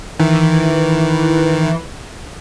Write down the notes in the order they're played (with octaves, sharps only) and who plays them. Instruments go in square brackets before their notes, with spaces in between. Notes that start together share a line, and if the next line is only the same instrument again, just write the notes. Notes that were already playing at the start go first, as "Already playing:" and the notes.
[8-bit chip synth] D#3 [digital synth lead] E3